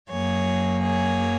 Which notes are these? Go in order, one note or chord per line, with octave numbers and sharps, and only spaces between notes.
F#2 F#3 A#3 G#4 C#5
G#4 C#5